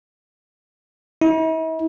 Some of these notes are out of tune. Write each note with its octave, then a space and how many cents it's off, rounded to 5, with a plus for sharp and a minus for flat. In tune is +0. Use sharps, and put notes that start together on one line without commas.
E4 -45